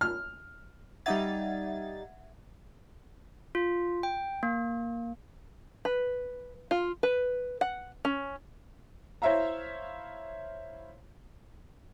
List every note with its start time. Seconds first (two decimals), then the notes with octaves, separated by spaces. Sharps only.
0.01 F6
1.06 G3 D#4 E5 F#5 G#6 A6
3.55 F4
4.03 G5
4.43 A#3
5.85 B4
6.71 F4
7.03 B4
7.61 F#5
8.05 C#4
9.22 E4 C5 C#5 E5 F5 A#5